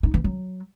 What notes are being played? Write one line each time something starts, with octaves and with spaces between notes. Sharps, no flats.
D#4
E3
F#3